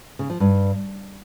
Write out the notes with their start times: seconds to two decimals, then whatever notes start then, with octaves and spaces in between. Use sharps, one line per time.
0.19 C#3
0.30 F3
0.40 G2